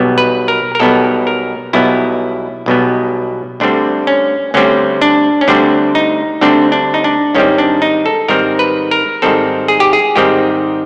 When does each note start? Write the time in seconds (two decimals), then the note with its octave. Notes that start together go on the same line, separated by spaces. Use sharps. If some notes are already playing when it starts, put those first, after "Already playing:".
Already playing: B1 B2 G3 B3
0.18 B4
0.48 A#4
0.75 A#4
0.80 B1 B2 G3 B3 A4
1.27 A#4
1.73 B1 B2 G3 B3 E4
2.66 B1 B2 G3 B3
3.60 D2 D3 G3 C4 D4
4.07 C#4
4.54 D2 D3 G3 C4 C#4
5.02 D4
5.41 C#4
5.48 D2 D3 G3 C4 D4
5.95 D#4
6.41 D2 D3 G3 C4 D4
6.72 D4
6.94 D#4
7.04 D4
7.35 G#2 D#3 G3 C4 C#4
7.58 D4
7.82 D#4
8.06 A4
8.28 G#2 D#3 G3 C4 A#4
8.59 B4
8.91 A#4
9.22 G#2 D#3 G3 C4 A4
9.68 G#4
9.80 G4
9.93 G#4
10.16 G#2 D#3 G3 C4 G4